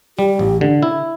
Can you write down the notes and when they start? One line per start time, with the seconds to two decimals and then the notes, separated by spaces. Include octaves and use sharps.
0.18 G3 G4
0.39 A1
0.61 D3
0.83 E4